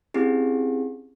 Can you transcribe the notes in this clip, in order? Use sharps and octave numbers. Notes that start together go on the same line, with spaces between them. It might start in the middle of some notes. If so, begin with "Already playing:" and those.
C4 C#4 E4 G4 G#4